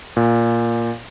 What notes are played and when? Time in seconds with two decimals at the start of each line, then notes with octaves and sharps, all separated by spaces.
0.17 A#2